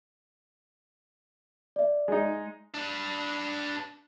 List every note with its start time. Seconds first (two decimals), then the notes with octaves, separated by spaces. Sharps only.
1.76 D5 E5
2.08 G#3 D#4
2.74 D4 B4